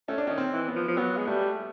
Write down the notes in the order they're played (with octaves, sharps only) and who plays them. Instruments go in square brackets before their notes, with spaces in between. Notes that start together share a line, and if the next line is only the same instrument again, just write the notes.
[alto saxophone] A3 [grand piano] C#4
[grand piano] D4
[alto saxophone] D#3 [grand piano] C#4
[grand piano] C4
[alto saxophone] E3
[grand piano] B3
[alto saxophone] F3
F3
[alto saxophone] F#3 [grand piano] B3
[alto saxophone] G#3
[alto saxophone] G3 [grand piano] A3